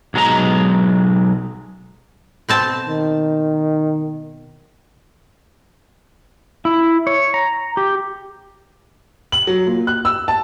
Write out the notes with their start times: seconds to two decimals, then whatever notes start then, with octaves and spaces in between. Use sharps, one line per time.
0.14 B1 F#3 G#3 A#5
2.49 B2 C4 A5
2.88 D#3
6.65 E4
7.07 C#5
7.34 A#5
7.77 G4
9.32 F#7
9.47 F#3
9.67 A#2
9.87 F#6
10.05 E6
10.28 A5